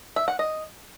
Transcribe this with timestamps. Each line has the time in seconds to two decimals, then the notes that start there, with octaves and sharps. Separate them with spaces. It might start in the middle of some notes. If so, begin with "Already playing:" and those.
0.16 E5
0.28 F#5
0.39 D#5